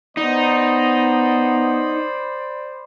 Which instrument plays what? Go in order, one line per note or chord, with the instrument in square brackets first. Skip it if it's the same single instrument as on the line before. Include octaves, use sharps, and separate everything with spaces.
[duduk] B3 [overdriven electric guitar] D#4 [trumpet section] C5 D5 B5